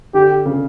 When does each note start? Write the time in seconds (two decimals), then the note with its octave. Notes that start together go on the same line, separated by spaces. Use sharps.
0.14 D3 G4
0.46 C#3